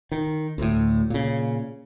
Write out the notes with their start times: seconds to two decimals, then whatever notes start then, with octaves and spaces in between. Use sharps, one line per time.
0.12 D#3
0.58 D2 A2
1.10 A#2 C#3